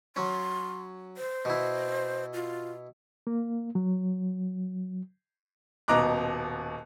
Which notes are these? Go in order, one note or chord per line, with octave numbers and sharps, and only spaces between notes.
F#3 C#4 C6
C5
B2 E4
F4
A#3
F#3
D#1 B2 D#5 A#5 D6 F#6